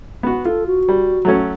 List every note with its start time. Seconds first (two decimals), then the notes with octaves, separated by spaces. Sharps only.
0.23 B3 F#4
0.45 F4 A4
0.66 F#4
0.89 G3
1.25 F#3 A3 C#4